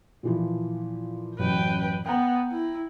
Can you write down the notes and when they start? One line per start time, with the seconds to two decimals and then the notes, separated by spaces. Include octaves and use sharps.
0.23 A#2 E3 F3
1.39 A1 F#2 B4 G5
2.06 B3 G5 A#5
2.52 E4